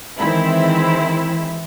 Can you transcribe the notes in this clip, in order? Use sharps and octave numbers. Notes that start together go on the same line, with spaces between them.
D#3 E3 G#3 C4 E4